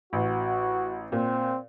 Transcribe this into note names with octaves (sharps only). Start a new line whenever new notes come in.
A1 F#4
A#2 C4